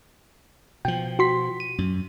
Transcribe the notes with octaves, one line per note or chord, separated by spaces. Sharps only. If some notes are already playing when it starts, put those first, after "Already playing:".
B2 F3 G5
F#4 C6 B6
D#7
F#2